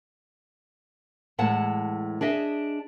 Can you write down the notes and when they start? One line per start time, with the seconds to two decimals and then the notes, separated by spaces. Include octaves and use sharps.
1.38 E2 A2 G#3 F#5 A5
2.21 D4 G#4 D#5 E5